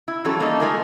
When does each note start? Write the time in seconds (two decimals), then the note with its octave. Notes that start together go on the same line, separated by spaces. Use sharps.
0.08 E4
0.25 E3 F#3 G3 C#4 A4
0.40 G3 A#3 D4 D#4 A4
0.60 G#3 A3 F4 A#4 E5 G#5